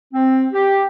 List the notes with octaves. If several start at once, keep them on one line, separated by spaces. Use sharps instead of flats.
C4
G4